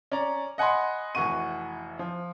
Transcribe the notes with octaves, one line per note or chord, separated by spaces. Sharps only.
C#4 D5 A#5
D#5 F#5 G#5 B5 C6
F1 E3 F#4 C#6 D#7
F3